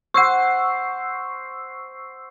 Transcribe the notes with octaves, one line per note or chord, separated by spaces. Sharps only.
C5 F#5 C#6 E6 C7